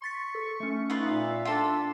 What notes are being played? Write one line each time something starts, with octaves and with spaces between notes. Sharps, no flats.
C6 C#6 A6 B6
A4
A3 C#4
D#4 F4 B4 E5
A#2 F5
D4 F4 A4 G5 C6 A6